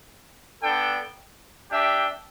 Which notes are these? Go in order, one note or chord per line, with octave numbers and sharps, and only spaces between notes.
B3 D4 A4 G5
D4 G4 E5 G5